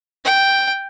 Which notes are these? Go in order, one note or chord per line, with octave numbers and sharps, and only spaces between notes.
G5